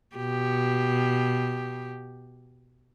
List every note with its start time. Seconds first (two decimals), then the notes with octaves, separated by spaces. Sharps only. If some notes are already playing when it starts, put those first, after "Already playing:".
0.17 B2 G4